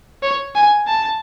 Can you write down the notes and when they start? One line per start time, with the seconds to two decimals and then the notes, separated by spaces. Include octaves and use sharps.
0.23 C#5
0.55 G#5
0.87 A5